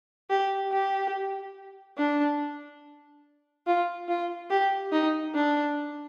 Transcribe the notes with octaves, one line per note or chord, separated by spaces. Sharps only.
G4
G4
D4
F4
F4
G4
D#4
D4